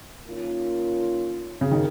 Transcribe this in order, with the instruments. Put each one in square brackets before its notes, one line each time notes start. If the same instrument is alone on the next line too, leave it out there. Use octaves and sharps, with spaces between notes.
[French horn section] D#3 A#3 C#4 F4
[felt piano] C#3
D#3